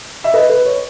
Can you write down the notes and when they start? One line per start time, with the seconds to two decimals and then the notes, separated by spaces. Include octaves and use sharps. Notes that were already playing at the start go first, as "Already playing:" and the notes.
0.24 E5
0.34 B4 D#5
0.49 B4
0.65 C#5